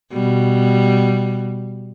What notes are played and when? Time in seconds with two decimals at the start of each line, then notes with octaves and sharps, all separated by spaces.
0.13 B2 G3